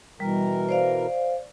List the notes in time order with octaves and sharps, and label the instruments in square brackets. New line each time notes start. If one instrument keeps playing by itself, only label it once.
[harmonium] B2 E3 A#4 [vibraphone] G3
[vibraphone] C5 D5 F5